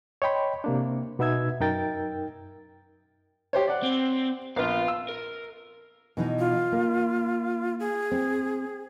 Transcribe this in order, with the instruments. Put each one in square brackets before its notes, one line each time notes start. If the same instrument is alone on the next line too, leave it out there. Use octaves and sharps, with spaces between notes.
[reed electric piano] C#5 D#5 G5 B5 C6
C3 A#3 D4
B2 B3 D#4 E5 E6 G#6
F#2 D#4 A#4 G5 A6
[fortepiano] G4 C5 C#5
D5 F#5
[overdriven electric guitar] C4
[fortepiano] A#1 B3 F6 [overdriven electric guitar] F5 C6
[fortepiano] E6
[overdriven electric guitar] A#4
[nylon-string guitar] B2 E3 D#4
[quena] F4
[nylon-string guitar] A#3
[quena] G#4
[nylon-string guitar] C4